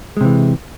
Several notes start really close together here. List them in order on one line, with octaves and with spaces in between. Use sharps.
G#3 C3 E3